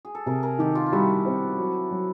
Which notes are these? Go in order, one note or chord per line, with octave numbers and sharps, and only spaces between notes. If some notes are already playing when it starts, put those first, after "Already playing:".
G#4
A4
C3 G#4 A#4
G#4 A#4
D#3 G4 A4
F4 G4
F4
G3 E4 F#4
C4
F#3
F#3